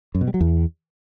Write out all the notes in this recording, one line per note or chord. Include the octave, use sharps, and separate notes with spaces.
F#2
B2
G3
F#3
E2